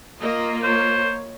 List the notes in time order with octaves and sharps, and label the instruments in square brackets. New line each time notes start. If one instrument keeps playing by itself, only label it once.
[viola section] A#3 F4 [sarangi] D#5
[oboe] C5 [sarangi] C#5